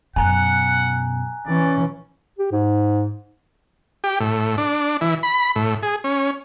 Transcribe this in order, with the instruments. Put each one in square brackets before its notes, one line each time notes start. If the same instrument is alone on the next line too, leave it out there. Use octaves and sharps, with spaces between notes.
[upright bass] F#2 B2 [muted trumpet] F#5 [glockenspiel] G#5 A#5 F#6
[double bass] E3 C#4 [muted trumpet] D5
[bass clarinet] G4
G#2
[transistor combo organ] G4
A2
D4
E3
B5
A2
G#4
C#4